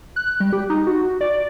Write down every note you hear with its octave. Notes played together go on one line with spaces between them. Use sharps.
F#6
G3
G4
D#4
F#4
D5